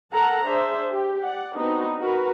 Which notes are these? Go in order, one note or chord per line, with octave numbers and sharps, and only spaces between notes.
A4 A#4 F#5 A5 A#5
D4 G#4 C5 E5
G4
D5 F#5
B3 C4 D4 D#4 F#4
F#4 A#4 B4